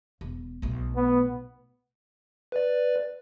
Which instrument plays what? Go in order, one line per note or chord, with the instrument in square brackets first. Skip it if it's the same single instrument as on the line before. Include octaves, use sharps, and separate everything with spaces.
[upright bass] E1
B1 A3
[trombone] B3
[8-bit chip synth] B4 D5